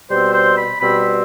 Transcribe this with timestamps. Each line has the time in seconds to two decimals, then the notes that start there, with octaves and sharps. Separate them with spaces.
0.09 B2 G3 C4 C5
0.33 C5
0.57 B5
0.80 B2 G3 C4 B5